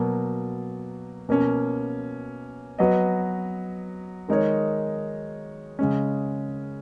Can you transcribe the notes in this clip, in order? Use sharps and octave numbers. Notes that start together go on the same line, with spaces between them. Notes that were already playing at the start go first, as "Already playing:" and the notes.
Already playing: B2 F#3 A#3
B2 A#3 C#4
F#3 B3 F#4 B4 D#5
D#3 G#3 D#4 A#4 C#5
C#3 G#3 C#4